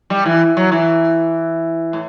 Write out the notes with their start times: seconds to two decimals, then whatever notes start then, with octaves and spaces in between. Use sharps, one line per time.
0.10 G3
0.26 E3
0.57 F#3
0.72 E3
1.93 A2